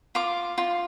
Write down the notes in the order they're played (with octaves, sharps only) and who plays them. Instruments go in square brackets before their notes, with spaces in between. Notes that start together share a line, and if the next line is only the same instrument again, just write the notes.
[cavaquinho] F4 D6
F4